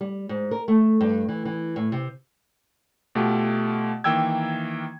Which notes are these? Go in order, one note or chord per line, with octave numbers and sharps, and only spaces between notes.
G3
G#2
A#4
A3
G2
E3
E3
A2
C3
B2 A3 F4 G4
D#3 E3 A#3 G5 E6 G#6